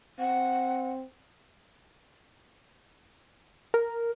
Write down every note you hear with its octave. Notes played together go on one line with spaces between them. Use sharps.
C4 F#5
A#4